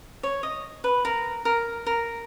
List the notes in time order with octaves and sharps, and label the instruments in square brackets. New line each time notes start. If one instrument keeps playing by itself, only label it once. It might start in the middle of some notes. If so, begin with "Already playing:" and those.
[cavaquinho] C#5
D#5
B4
A#4
A#4
A#4